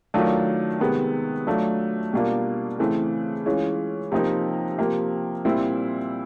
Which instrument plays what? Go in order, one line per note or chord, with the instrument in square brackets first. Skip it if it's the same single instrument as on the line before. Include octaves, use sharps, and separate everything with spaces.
[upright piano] D#3 F#3 A3 D4 F4
C3 D#3 G#3 B3
F#3 A3 D4 F4
B2 G3 A#3 D4 F4
C#3 E3 A3 C4
E3 G#3 C#4 F4
C3 F3 A#3 D#4
C3 F3 A#3
A#2 G3 C4 E4